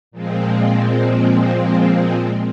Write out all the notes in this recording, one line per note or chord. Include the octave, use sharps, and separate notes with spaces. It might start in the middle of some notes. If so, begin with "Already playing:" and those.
A#2 F3 G#3 C4